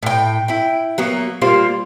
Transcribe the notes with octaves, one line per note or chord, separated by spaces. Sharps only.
A2 G5
E4 G5
F#3 A#3 B3
G3 A#3 F4 C5